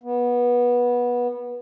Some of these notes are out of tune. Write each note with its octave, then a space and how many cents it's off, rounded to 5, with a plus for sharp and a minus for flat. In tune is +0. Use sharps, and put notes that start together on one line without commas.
B3 -20